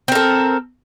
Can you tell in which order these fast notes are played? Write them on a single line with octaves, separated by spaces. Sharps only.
C4 A#4 A4